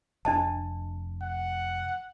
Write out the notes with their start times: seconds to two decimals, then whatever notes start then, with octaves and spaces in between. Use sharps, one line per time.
0.25 F1 D4 D#5 A5
1.22 F#5